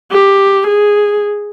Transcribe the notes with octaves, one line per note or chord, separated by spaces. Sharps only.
G4
G#4